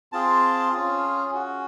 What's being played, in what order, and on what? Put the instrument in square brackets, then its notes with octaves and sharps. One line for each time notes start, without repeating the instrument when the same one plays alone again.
[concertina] C4 F4 G#4 A5
C#4 F4 G#4
C#4 F#4